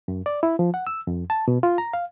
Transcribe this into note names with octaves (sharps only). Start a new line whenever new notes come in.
F#2
D5
E4
F3
F#5
E6
F2
A5
B2
F4
A#5
F5